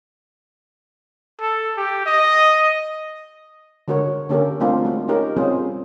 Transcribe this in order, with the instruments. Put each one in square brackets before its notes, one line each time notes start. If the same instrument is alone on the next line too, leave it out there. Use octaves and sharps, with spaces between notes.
[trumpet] A4
G4
D#5
[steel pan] D3 G#3 F#4 A#4 C#5
D3 A#3 C#4 G4 A4 A#4
G3 A3 A#3 C4 D4 F4
G#3 F#4
C#4 D#4 G4 A#4
G3 C4 C#4 F4 G#4 C5